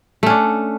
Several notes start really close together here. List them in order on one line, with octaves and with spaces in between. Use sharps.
A3 C#4 D4